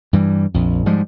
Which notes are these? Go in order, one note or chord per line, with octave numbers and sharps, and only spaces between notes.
G2 E3 G3
A#1 F2
G#2 F3 G3 G#3